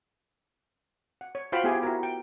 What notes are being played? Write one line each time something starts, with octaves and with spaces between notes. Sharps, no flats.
F#5
C#5
F4 F#4 C5 F5 G5 B5
B3 E4 G4 G#4 G#5
E4 F#4 A#4
G5